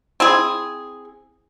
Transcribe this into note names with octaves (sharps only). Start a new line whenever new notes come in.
C4 E4 G#4